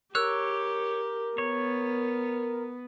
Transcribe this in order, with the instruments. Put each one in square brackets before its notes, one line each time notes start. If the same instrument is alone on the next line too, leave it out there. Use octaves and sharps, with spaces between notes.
[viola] G4 [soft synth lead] A#4 [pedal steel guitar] C#5 [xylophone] E6 F#6
[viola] B3 [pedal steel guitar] C#5